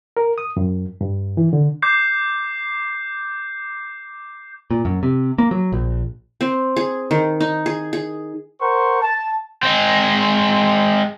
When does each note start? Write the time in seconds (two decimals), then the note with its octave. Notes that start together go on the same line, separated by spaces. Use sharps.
0.17 A#4
0.38 D#6
0.57 F#2
1.01 G2
1.37 E3
1.53 D3
1.82 D6 G6 C7
4.71 A#2
4.85 F#2
5.03 C3
5.38 A#3
5.51 F#3
5.72 A#1
6.41 C4
6.76 G#4
7.11 D#3
7.40 D#4
7.66 G#4
7.93 G#4
8.60 A#4 C5 F#5 C#6
9.02 A5
9.63 G#3 C4